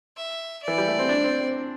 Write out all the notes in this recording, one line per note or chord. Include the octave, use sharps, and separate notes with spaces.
E5
D5
E3
G3
A3
C4
D4
C4
C4